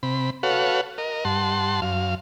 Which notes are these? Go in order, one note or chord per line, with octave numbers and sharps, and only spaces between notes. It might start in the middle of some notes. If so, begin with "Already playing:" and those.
C3 B5
F#4 A4 B4 C#5 F5 F#5
A#4 D#5
G2 F#5 A5 C6
F#2 F5